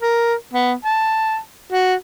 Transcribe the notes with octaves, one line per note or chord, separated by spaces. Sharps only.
A#4
B3
A5
F#4